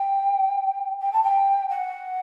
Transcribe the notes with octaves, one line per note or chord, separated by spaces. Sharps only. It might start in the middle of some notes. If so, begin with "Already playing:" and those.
Already playing: G5
G5
A5
G5
F#5